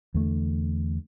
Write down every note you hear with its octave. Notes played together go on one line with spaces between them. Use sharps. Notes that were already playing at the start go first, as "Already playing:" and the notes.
E2 D3 A3